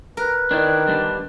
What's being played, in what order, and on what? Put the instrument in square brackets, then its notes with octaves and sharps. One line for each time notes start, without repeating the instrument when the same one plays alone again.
[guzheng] A#4 [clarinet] B4
[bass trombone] D#3 [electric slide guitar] D4 E4 D5
[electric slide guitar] D3 G3 D4